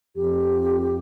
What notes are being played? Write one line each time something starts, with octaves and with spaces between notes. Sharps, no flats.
F2 G4